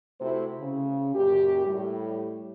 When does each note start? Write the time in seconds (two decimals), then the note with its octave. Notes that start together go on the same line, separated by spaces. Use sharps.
0.21 C3 A3 E4 F#4 C5
0.61 C#3
1.15 F#2 A#2 G4
1.66 A2 G3